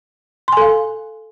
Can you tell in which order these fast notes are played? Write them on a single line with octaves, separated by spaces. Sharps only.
C6 G#5 A4 F5